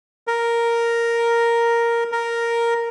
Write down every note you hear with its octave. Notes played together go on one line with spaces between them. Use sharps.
A#4
A#4